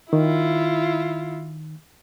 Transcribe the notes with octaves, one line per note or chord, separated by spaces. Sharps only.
D#3 E4 F4